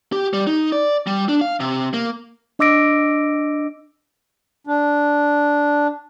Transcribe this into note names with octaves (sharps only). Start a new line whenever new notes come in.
G4
G3
D#4
D5
G3
D4
F5
C3
A#3
D4 D#5 D6 E6 A#6 D7
D4